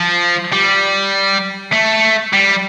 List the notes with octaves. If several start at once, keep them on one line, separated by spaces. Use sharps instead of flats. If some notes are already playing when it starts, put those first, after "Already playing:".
Already playing: F3
G3
A3
G3